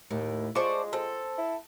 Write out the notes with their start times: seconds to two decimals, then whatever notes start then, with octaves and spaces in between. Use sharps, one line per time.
0.10 D#2 A2
0.55 G#3 F4 C5 D5 A5 C#6
0.93 C4 A4
1.38 E4